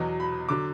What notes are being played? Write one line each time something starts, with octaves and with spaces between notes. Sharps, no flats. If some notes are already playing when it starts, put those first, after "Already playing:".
Already playing: E2 B2 F#3
B5
D3 F#3 D6